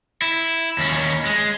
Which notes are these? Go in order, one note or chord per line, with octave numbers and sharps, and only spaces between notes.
E4
D#2 C#4
G#3